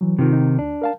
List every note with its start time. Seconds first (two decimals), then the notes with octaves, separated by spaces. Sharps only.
0.01 E3 F#3
0.19 C3 D#3 F4
0.33 D#4
0.59 D2 D4
0.82 A#4 F5 A5